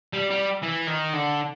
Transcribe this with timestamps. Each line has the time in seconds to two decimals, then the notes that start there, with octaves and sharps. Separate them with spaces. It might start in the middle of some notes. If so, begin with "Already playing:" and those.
0.13 G3
0.30 G3
0.63 E3
0.88 D#3
1.13 D3